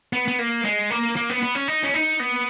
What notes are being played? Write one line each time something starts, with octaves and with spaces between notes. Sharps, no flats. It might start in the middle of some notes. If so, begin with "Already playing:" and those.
B3
B3
A#3
G#3
A#3
A#3
B3
B3
C#4
D#4
C#4
D#4
B3